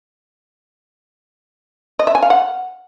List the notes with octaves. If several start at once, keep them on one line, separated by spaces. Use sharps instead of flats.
D#5
E5
G#5
F5
F#5